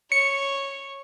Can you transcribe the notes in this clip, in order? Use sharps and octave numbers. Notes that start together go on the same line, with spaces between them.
C#5 C#7